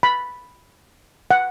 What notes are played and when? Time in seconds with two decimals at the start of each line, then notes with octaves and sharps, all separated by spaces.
0.03 B5
1.31 F#5